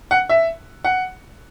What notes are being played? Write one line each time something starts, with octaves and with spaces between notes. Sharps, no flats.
F#5
E5
F#5